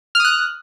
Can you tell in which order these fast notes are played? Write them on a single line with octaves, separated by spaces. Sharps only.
F6 D#6 F#6